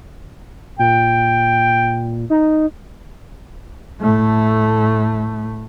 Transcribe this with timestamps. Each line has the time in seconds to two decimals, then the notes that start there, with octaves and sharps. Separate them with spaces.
0.79 A#2 G5
2.30 D#4
4.01 A2 A3